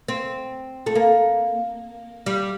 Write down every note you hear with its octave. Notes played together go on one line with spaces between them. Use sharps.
C4
A3
A#3
G3